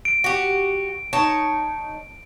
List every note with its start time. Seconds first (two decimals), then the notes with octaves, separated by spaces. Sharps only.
0.05 D7
0.24 F#4 G4
1.13 D#4 C#5 A5